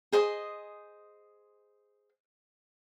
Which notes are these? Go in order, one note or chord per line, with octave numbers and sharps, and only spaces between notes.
G#4 C5 D#5 C6